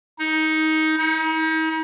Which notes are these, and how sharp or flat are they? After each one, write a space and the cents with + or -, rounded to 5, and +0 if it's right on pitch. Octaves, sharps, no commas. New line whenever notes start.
D#4 +15
D#4 +40